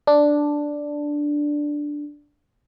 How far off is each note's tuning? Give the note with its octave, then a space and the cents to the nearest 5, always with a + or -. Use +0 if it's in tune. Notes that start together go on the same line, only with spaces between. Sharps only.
D4 +0